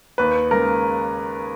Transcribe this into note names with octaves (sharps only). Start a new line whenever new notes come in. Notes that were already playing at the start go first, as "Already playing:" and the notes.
D#2 B4
C#3 G#3 A#4